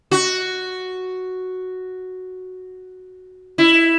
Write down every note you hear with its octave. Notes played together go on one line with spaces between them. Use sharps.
F#4
E4